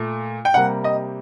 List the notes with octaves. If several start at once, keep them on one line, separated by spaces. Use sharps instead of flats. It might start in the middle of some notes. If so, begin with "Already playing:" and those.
Already playing: A#2 A3
G5
C3 G3 A#3 F#5
D#5